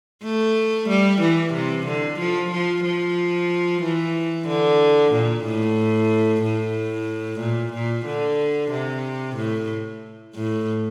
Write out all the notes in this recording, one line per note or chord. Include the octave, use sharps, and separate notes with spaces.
A3
G3
E3
C3
D3
F3
F3
F3
E3
D3
A#2
A2
A2
A#2
A#2
D3
C3
A2
A2